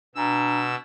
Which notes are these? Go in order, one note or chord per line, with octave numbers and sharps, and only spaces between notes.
B2 D4 G#5 A#5 E6